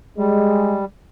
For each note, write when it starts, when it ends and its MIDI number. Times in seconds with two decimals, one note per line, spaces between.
0.18 0.85 55
0.18 0.80 56